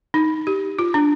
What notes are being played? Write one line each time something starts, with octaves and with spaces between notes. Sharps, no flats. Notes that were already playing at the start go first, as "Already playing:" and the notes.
D#4
G4
F4
D4